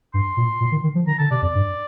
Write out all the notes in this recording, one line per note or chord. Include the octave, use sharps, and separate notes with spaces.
G2 C6
A#2
A#2
D#3
D#3
F3
D#3 A#5
D3 A5
C3 D5
F2 D5
G2